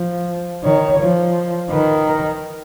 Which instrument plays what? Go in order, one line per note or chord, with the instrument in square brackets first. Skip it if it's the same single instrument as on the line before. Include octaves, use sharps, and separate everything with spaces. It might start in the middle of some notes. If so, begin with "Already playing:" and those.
Already playing: [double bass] F3
[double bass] D#3 [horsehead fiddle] C#5
[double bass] F3
[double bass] D#3 [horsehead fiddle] B4
[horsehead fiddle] A#4